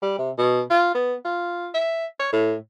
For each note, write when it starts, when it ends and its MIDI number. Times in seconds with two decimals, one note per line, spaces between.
0.02 0.17 55
0.19 0.31 48
0.38 0.61 47
0.70 0.93 65
0.94 1.15 59
1.25 1.68 65
1.74 2.06 76
2.19 2.32 73
2.33 2.55 45